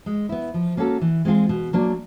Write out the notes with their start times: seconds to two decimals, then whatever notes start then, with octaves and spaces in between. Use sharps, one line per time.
0.06 G#3
0.29 B3 E4
0.54 F3
0.77 A#3 C#4 F#4 A4
1.01 E3
1.25 G#3 C4 F4 G#4
1.49 B2
1.73 F#3 A#3 D4